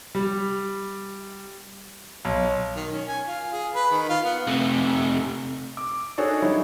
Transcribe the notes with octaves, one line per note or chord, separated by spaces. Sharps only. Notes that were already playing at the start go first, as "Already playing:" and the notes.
G3
B1
D#3
C#4
G#5
F4
G#4
B4
D#3
F4
B3
C3 A3
D6
D4 D#4 F#4 G#4 A4 C#5
D#3 F#3 G3 D#4 E4